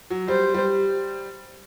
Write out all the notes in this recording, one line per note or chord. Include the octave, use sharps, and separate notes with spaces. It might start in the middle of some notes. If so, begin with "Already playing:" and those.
F#3
G3 C5
G3